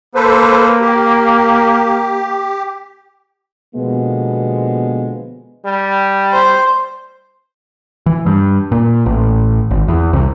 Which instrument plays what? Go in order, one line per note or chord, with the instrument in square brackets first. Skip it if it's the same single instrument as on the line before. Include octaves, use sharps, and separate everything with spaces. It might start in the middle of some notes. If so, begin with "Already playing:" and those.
[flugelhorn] A#3 [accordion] A4 B4 C5
[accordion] G4
[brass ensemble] B2 D3 F3 G#3 A#3 B3
[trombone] G3
[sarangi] C5
[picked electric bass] E3
G2
A#2
A1
G#1
E2
C2